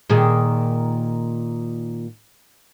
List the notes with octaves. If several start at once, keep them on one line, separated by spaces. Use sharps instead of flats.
A#2 D#3 G#4